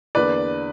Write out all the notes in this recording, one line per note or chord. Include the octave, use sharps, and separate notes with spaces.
E2 D3 A#3 B4 D5